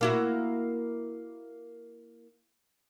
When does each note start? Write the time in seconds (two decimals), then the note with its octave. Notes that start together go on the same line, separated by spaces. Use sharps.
0.01 A#3 E4 F#4